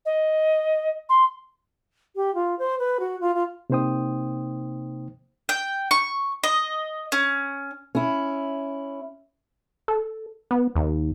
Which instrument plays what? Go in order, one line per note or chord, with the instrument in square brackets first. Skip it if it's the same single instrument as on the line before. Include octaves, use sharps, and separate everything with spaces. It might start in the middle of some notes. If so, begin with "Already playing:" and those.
[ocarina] D#5
C6
[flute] G4
F4
C5
B4
F#4
F4
F4
[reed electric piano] C3 A#3 D#4 C5 G5 D#6
[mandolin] G5
C#6
D#5
C#4
[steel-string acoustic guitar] C#4 E4
[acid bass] A4
B3
D#2